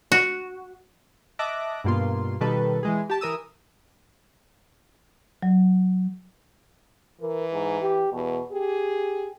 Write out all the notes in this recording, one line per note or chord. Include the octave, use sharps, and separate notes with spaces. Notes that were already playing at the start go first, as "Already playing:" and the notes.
F#4
D#5 E5 A5 D6 F#6 A#6
G2 B2 A#3 F4 C6
B2 D#3 G3 A4 B4
E3 G#3 G#4
G4 A5
E3 A#4 D#6 E6
F#3
E3 A#4
G#2
G4
E2 B2
G4 G#4